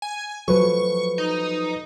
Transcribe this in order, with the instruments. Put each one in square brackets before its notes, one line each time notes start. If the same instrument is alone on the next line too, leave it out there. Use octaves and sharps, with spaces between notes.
[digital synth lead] G#5
[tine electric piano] F3 B4 [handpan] F#3 A4 [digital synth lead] C#6
[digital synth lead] D#4